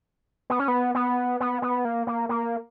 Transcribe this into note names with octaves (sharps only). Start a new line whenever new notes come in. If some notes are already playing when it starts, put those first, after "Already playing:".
B3
C#4
B3
B3
B3
B3
A#3
A#3
A#3